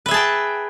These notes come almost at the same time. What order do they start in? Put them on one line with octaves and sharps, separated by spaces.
B4 E5 G#4 A5 G5